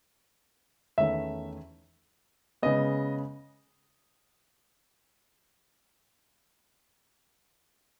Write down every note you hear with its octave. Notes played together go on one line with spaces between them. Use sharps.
E2 D#3 A3 C#4 E5
C#3 G#3 B3 D#5